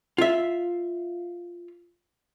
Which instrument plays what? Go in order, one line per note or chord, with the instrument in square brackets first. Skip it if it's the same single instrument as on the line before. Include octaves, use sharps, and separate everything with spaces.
[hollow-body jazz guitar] F4 E5